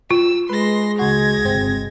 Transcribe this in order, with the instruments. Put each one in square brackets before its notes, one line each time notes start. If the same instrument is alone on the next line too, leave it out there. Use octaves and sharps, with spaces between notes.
[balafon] F4 [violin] E6
[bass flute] G#3 [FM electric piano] B4 [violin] C6 A#6
[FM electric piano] C#2 F#4 [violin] G#6 A#6
[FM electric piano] G1 C3 C4